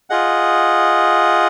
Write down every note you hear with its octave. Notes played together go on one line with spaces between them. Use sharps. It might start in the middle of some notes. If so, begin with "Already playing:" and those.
F4 G#4 D#5 F#5